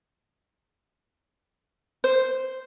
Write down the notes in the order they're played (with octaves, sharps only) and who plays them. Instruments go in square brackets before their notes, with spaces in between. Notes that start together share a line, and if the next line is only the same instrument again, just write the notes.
[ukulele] C5